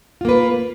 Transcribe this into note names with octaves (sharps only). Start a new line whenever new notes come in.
A#3 F4 B4